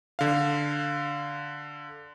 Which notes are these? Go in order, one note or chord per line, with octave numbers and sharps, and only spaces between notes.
D3 F5